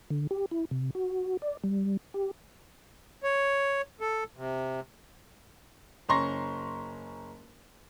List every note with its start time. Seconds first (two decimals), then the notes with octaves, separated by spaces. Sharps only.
0.10 D3
0.31 G4
0.51 E4
0.71 C3
0.95 F#4
1.42 D5
1.64 G3
2.14 G4
3.23 C#5
4.01 A4
4.37 C3
6.09 F#1 C#4 A#5 C6 C#6 A#6